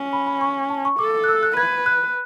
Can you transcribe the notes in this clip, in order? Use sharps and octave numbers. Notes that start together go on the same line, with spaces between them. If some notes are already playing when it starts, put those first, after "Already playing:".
Already playing: C#4
B5
B5
C#6
A5
C#6
A4 D6
F#6
E6
F#6
B4 G#6
F#6